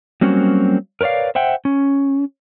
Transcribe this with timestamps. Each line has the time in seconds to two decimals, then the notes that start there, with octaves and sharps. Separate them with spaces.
0.21 F#3 G3 A#3 C4 C#4 F#4
1.01 A#4 B4 C#5 D5 F5
1.35 C5 E5 F#5 G5
1.65 C#4